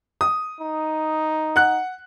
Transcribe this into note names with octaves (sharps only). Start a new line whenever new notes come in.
D#6
D#4
F#5 F#6